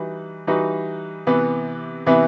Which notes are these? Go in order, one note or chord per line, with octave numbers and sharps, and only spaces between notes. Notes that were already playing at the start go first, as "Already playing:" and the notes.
Already playing: E3 G3 D#4 F#4 B4
E3 G3 D#4 F#4 B4
C3 E3 B3 E4 B4
C3 E3 B3 E4 B4